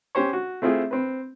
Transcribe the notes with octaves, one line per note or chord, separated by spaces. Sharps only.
C#4 G4 C5 C#5
F#4
A3 C4 E4 F4 G#4
C4 B4